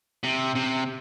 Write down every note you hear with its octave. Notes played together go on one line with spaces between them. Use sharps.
C3
C3